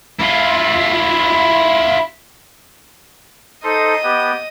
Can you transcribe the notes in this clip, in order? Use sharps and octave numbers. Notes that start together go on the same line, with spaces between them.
E4 F4
D#4 A4 C5 D#5
B3 G4